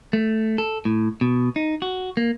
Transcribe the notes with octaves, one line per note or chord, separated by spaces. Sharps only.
A3
A4
A2
B2
D#4
F#4
A#3